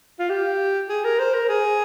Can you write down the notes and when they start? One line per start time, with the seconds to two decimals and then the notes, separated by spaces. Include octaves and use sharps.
0.19 F4
0.30 G4
0.89 G#4
1.04 A#4
1.19 C5
1.34 A#4
1.49 G#4